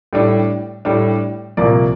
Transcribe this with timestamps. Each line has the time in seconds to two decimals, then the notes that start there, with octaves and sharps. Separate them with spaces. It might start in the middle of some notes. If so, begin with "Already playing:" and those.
0.13 A2 G3 D4
0.85 A2 G3 D4
1.57 C2 A#2 F3 A#3 D5